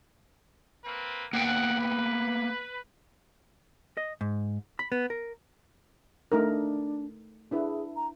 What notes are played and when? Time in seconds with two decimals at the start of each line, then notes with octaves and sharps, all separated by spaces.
0.84 A#3 C4 B4
1.33 A#3 B3 F#5 G5
1.79 B4
3.97 D#5
4.21 G#2
4.79 B5
4.92 B3
5.10 A#4
6.32 A3 D4 D#4 A#4
7.51 D4 E4 G#4 B4
7.96 A#5